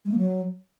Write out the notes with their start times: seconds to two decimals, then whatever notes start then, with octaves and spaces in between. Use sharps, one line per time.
0.05 G#3
0.11 A#3
0.18 F#3